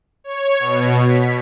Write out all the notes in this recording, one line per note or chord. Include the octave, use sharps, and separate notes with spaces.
C#5
B2
B6